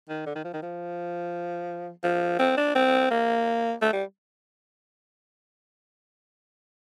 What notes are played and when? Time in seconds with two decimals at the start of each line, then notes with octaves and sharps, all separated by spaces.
0.09 D#3
0.26 D3
0.36 D#3
0.45 F3
0.54 D#3
0.62 F3
2.04 F3
2.39 C4
2.57 D4
2.75 C4
3.11 A#3
3.82 A3
3.93 G3